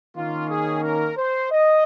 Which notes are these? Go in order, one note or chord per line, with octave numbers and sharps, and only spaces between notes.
D#3 A#3 C#4 F4
G#4
A#4
C5
D#5